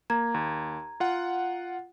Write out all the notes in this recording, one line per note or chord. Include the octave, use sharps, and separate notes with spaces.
A#3 A#5 G#6
D#2
F4 F#5